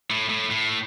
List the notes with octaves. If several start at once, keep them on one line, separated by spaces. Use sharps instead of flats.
A2
A2
A2